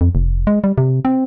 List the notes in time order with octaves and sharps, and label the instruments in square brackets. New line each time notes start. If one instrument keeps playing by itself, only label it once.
[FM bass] F2
F1
G#3
G3
C3
C4